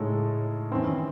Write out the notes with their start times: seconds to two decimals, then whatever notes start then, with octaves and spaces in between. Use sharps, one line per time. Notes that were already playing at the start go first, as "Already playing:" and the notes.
Already playing: A2 C#3 G#3 D#4 A4
0.71 F#2 D#3 E3 C4 E4